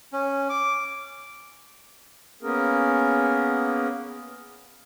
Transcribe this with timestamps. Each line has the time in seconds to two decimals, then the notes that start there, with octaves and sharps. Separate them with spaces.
0.13 C#4
0.49 D6
2.43 A#3 B3 C#4 G#4 A#4